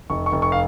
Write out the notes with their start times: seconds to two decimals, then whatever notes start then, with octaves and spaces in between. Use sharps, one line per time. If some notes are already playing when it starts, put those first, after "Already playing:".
0.10 F1 C#6
0.26 C#6
0.32 F1
0.42 C#6
0.52 F5